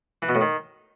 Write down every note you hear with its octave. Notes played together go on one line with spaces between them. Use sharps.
E3
B2
A2
D#3